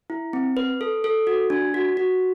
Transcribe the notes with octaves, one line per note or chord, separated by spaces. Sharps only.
E4
C4
B4
A4
A4
F#4
D4
F#4
F#4